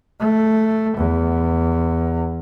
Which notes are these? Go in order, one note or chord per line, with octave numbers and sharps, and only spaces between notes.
A3
E2